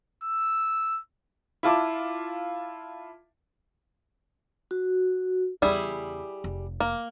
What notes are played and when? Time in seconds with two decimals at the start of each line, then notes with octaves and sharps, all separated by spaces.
0.24 E6
1.63 E4 F4 A5 D6
4.71 F#4
5.62 E2 C#3 G3 E4 G#4
6.44 F1
6.80 A#3